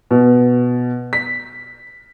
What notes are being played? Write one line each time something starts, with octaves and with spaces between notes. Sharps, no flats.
B2
B6